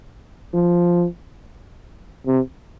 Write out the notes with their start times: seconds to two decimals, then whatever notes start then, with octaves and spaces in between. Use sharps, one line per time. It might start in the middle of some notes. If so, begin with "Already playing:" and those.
0.54 F3
2.26 C3